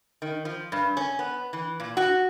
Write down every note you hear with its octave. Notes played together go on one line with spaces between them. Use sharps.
D#3
F3
G2
C#4
B3
E3
A#2
F#4